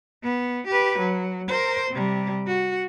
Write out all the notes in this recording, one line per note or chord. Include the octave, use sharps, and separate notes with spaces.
B3
G4 B4
F#3
A#4 C5
C3 G3
F#4